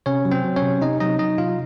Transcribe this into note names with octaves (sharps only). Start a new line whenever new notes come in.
C3 C#4 C#5
F#3
C4 C5
F#3
C#4 C#5
C3
C3 D#4 D#5
F#3 D#4 D#5
F#3 D#4 D#5
C3 F4 F5